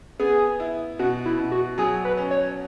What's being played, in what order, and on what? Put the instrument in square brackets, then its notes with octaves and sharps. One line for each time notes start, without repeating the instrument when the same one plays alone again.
[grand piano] B3 [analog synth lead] G#4
[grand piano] E4
[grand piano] B2 [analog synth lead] F#4
[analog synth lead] E4
[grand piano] B2
[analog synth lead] F#4
[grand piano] F#3 [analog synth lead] G#4
[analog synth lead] B4
[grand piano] C#4
[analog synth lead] C#5